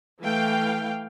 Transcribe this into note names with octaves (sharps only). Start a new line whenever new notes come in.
E3 A3 F5 G5